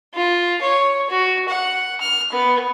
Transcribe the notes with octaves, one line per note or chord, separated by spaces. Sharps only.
F4
C#5
F#4
F#5
F6
B3